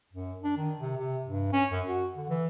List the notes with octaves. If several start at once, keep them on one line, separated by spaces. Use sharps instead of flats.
F#2
D4
D#3
C3
C3
G2
C#4
F#2
F#4
D3
E3